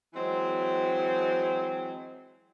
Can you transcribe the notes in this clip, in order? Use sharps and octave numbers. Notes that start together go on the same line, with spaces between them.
E3 F#3 G#3 C4